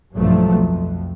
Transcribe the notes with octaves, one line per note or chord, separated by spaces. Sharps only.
B1 G2 F3 F#3 A3
F2